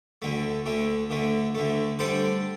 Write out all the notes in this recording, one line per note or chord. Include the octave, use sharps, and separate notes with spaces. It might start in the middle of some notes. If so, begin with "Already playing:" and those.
D2 D3 A3
D2 D3 A3
D2 D3 A3
D2 D3 A3
D3 G3 D4 A4 C5